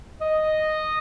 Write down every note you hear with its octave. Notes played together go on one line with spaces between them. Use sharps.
D#5